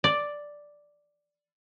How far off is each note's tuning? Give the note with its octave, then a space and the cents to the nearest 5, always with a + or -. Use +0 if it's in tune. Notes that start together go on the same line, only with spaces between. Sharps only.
D5 +0